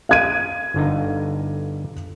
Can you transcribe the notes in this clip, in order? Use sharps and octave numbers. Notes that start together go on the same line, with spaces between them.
F5 G#6 D#7
G1 D3 D#4